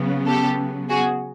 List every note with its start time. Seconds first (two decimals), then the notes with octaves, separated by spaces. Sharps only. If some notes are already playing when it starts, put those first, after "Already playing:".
Already playing: C#3 F#3 B3
0.26 G4 A4
0.89 F#4 G#4